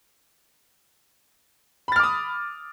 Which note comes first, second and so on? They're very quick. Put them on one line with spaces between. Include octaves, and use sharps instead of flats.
B5 A6 F6 D6 D#6